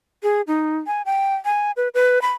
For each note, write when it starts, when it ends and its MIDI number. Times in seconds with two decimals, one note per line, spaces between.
0.23 0.41 68
0.47 0.77 63
0.87 1.02 80
1.06 1.35 79
1.45 1.72 80
1.77 1.88 71
1.94 2.21 71
2.22 2.32 83